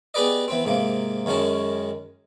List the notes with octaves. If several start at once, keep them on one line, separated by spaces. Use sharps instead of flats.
B3 G4 G#4 B4 D5 D#5
E3 B3 C4
G#2 C3 A#3
F#2 D#3 G#3 C#4 A5